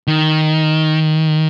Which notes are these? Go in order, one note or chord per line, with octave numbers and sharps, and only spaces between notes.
D#3